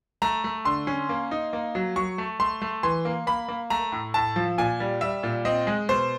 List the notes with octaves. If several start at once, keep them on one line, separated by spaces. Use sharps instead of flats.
A3 A#5
A3
D3 C6
C#4
A#3
D#4
A#3
F#3
F#3 C#6
A3
A3 C6
A3
E3 C6
A#3
A#3 B5
A#3
A3 A#5
A2
A2 A5
F3
A#2 G#5
G3
G3 E5
A#2
C4 D#5
G#3
B2 C5